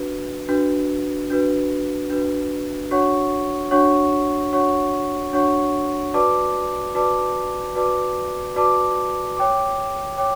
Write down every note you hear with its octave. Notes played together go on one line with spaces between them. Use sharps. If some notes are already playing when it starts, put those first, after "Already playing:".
Already playing: D4 F#4 B4
D4 F#4 B4
D4 F#4 B4
D4 F#4 B4
D4 F#4 C#5 F#5 C#6
D4 F#4 C#5 F#5 C#6
D4 F#4 C#5 F#5 C#6
D4 F#4 C#5 F#5 C#6
F#4 B4 D5 A5 D6
F#4 B4 D5 A5 D6
F#4 B4 D5 A5 D6
F#4 B4 D5 A5 D6
C#5 G5 D6
C#5 G5 D6